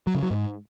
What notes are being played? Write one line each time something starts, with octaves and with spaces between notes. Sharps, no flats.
F#3
C#3
F#3
G#2